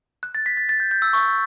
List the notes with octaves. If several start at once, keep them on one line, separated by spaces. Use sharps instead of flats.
F#6
A6
B6
A6
A6
G6
G6
E6
C#6